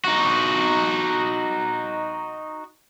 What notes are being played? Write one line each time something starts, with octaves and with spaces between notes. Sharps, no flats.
D#4 F#4